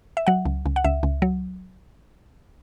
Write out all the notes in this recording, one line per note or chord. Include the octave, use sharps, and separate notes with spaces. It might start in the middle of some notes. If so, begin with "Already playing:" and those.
E5
F#3 F#5
C#2
C#2
F#5
C#2 E5
C#2
F#3